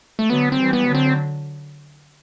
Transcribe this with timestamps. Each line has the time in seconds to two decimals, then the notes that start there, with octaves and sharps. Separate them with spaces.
0.19 A3
0.30 D3 F#3 B3
0.52 C4
0.59 E3 G3
0.73 B3
0.88 D3 F#3
0.95 C4